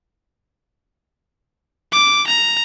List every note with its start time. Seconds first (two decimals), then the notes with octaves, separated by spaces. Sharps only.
1.92 D6
2.27 A#5